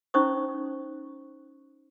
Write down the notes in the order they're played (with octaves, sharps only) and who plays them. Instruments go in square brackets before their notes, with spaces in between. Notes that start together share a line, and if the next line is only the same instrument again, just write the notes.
[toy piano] C#4 D#4 E4 C5 C#6 D#6